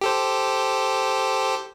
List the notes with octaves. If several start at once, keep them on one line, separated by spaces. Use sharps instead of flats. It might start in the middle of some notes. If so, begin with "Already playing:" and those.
G4 A4 C5